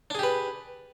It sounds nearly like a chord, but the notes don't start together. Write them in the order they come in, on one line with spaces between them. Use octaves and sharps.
D4 G#4 G4 B4